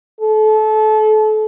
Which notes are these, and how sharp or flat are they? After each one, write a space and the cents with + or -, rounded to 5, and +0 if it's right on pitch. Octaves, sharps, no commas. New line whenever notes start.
A4 -30